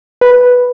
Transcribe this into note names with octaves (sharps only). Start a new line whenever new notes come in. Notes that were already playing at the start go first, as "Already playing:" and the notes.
B4